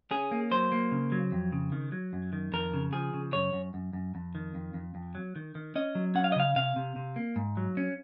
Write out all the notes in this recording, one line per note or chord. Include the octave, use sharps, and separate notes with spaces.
C#4 G#4
A#3
F#3 C5
A#3
C#3
F#3
F2
C#3
D#3
F#3
F#2
D#3
F2 A#4
C#3
F3 G#4
C#3
F#2 C#5
F#2
F#2
F#2
F2
D#3
F2
F2
F2
F#3
D#3
D#3
C#4 D#5
F#3
C#4 F#5
F5
D#5
C#3 F5
C3 F5
C3
C3
A#3
G#2
F#3
C#4